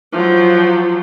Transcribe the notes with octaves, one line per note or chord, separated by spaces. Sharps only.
F3 F#3